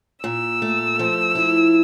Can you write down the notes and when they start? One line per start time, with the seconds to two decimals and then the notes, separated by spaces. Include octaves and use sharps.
0.24 A#2 E6
0.62 A3
0.99 F3
1.35 E4